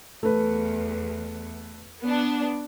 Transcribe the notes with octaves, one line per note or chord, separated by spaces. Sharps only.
E2 A3 B4
B3 D4